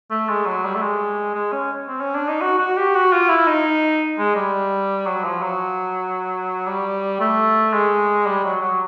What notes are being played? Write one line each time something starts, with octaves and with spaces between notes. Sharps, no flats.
A3
G#3
F#3
G3
A3
G#3
G#3
C#4
C4
C#4
D4
D#4
F#4
F#4
G4
F#4
F4
E4
D#4
G#3
G3
F#3
F3
F#3
G3
A3
G#3
G3
F#3
F#3